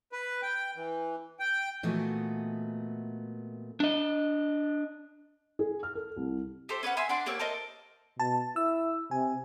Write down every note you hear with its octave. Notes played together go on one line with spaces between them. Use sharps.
B4
G5
E3
G5
A#2 E3 A3 B3 F#4 D#5
D4 D#5
G#4
F6
A4
C2
G4 A4 C5
C#4 B4 D5 F#5
E5 G#5 C6 E6
D4 F#5 C6 D6
A#3 G4 C#5 E6
A4 A#4 C5 D#5
B2 A5
E4 E6
C3 G#5